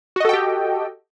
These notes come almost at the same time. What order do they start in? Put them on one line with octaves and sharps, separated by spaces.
F#4 D#5 A4 G5 G4